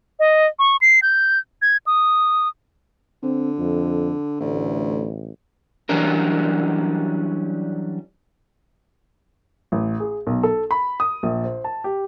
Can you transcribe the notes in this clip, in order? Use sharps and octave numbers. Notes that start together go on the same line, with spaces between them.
D#5
C#6
C7
G6
G#6
D#6
D3 C4
F2
A1 D2
E3 F#3 G3 C#4 D4 A#4
A1
G#4
B1
A4
B5
D#6
A#1
C5
A5
G4